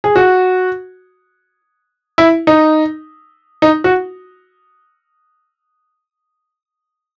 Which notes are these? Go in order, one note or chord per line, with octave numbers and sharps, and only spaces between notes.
G#4
F#4
E4
D#4
D#4
F#4